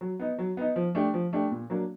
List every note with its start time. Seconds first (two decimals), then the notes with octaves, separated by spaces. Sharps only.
0.01 F#3
0.20 B3 D#4
0.39 F#3
0.57 B3 D#4
0.76 F3
0.95 A3 D4 G4
1.14 F3
1.33 A3 D4 G4
1.51 A#2
1.70 F#3 A#3 D4